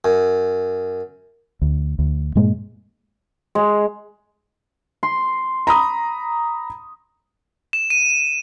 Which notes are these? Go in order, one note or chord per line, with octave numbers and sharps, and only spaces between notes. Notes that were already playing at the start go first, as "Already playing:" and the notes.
F#2
D2
D2
G2 A#2 G#3 A#3
G#3
C6
A#5 B5 D#6
E7
D#7